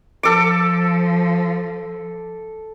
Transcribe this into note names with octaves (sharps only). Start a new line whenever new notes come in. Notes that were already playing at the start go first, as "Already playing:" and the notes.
F3 A4 D6